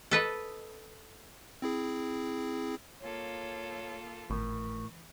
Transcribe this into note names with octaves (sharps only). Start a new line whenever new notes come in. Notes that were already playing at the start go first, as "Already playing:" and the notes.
A4 B4 D#5
C4 E4 G#4
A#3 F4 A4 C#5
G#1 A2 E3 A#4